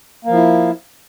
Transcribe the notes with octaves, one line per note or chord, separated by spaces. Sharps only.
F3 A#3 E4